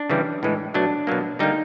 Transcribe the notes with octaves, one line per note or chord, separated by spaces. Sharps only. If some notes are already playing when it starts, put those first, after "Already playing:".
Already playing: D4
C#3 E3 G3
A2 E3 G#3
B2 F#3 A3 D4
B2 F#3 A#3
D3 G3 A#3 D#4